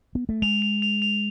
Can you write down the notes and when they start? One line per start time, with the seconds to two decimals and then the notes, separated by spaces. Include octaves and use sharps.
0.15 B3
0.29 A3
0.42 G#3 F7
0.62 F7
0.82 F7
1.02 F7